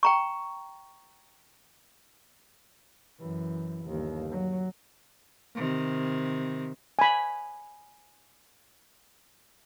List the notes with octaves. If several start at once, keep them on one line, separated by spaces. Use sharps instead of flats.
G5 A#5 C#6
F#2 E3
G1 D#2
F#3
C3 D#3
G#5 B5